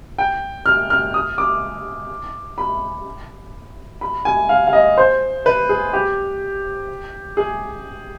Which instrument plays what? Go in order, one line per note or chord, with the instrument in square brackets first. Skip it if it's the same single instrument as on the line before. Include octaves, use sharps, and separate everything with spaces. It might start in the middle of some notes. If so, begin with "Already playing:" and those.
[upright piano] G5
F6
F6
D#6
D6
B5
B5
G#5
F5
F5
D#5
C5
B4
G#4
G4
G#4